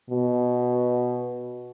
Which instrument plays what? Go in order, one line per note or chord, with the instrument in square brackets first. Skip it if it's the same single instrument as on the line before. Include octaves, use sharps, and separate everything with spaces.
[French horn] B2